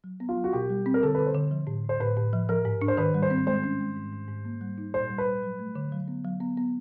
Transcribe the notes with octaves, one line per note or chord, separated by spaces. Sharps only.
F#3
B3
F4
F#3
F#4
B2 G4
G3
C4
A#4
D3 A4
D3 B4
C5
D3
F3
A2
A2
C5
A2 B4
A2
F3
F3 A#4
G#2
D4
C5
D#3 B4
G3
C5
C4
G#3 C5
C#4
G#3
G#2
G#2
G#2
A#3
G3
D#4
A#2 C5
G3
B4
G3
F#3
A3
D3
F#3
B3
F#3
B3
B3